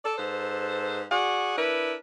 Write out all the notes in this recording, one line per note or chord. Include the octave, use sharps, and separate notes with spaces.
A4 D5
G#2 A4 B4 C5
F#4 G#4 D5 F#5
D4 E4 A#4 B4